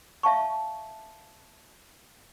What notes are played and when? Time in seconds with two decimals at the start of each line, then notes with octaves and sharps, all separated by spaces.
0.23 E5 F5 A5 C#6